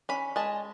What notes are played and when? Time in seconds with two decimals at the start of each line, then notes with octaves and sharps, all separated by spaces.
0.09 C#4 B5
0.36 G#3 A5